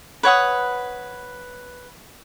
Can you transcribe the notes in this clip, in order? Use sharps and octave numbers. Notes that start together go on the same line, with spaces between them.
B4 C#5 F#5 D#6